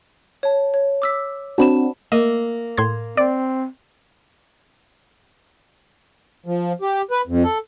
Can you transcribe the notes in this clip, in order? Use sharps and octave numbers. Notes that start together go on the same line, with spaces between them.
C#5 A5
C#5
D6 E6 B6
C4 D4 F#4 A5 B5 E7
A#3 D#5 E5
A2 C6 G#6
C4 D5
F3
G4
B4
F2
A4